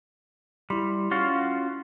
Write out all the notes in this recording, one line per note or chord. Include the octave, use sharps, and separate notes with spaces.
G3 E4 C6
C#4 F4 F#4